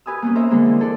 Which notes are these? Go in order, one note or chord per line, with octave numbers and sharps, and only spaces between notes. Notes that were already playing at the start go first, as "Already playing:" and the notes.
G4 B4 G#5 D#6 E6
A#3 B3 C#4
A#4 C5 C#5 E5
D3 G#3 A#3 C4 D4
E3
D4 A4 D5